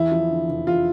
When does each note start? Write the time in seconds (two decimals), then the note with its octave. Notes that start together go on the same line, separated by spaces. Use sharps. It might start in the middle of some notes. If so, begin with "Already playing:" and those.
Already playing: E2 E4
0.12 F3
0.31 D3
0.49 F1
0.67 E2 F4